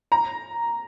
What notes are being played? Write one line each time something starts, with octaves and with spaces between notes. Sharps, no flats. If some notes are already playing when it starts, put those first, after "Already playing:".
A#5